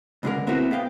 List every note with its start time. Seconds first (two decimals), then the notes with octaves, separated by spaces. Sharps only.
0.23 C#2 G2 D3 D4 G#4 A#4
0.47 B3 C4 E4 F#4 A#4 B4
0.71 B3 G#4 F5 G5